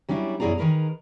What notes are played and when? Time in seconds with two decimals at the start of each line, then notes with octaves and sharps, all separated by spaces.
0.09 F#3 G3 C#4 D4 E4
0.40 F#2 B2 E4 G#4 D5 A#5
0.58 D#3 G#4 A#4 B4 A#5